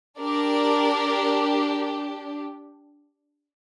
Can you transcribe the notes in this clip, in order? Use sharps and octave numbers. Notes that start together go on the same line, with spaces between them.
D4 G4 A#4 D5